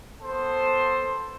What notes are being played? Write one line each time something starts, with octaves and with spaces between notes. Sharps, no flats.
B3 A4 C5